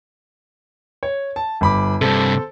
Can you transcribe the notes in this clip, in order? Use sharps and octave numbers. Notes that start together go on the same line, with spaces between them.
C#5
A5
G1 B5 D6
G2 C3 A4 C5